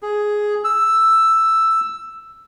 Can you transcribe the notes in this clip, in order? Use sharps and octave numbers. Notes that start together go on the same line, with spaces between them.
G#4
E6